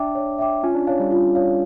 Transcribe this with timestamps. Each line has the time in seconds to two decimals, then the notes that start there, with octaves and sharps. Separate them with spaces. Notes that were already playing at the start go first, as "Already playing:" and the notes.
Already playing: D4 E5 G5 D6
0.15 C#5
0.39 E5 G5 D6
0.63 C#4 F4
0.75 D4
0.87 D4 C#5 F5
1.00 G3
1.11 F4
1.35 C#5 F5